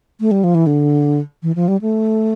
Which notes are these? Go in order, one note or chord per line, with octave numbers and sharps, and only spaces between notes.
A3
G3
F3
E3
D3
E3
F3
G3
A3